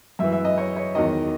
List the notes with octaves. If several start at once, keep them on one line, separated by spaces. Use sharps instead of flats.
F#2 E3 E5
E5
D#5
C#5
C#5
E2 D#3 F#3 D#5